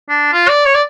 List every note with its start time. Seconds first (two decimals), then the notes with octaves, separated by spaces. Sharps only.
0.09 D4
0.32 F4
0.48 D5
0.65 C#5
0.74 D5